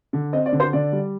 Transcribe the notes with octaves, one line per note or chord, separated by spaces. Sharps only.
D3
C4 D#5
D5
D3
C5
D3 D5
G3